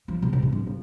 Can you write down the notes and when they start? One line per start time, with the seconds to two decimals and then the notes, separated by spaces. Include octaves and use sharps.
0.08 F3
0.22 B2
0.33 B2
0.42 A2
0.52 D3
0.67 F3